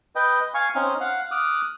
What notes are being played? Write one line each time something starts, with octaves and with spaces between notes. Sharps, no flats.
B4 D#5 G5
F5 G#5 C#6
C4 C#4 D#4 F6
F5 F#5
D6 D#6 F6 F#6